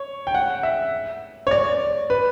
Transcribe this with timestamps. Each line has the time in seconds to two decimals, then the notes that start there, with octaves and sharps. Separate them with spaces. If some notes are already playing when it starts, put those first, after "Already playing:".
Already playing: C#5
0.27 G5
0.35 F#5
0.63 E5
1.47 C#5
1.51 D5
2.10 B4